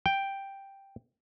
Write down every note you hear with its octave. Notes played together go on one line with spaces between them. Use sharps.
G5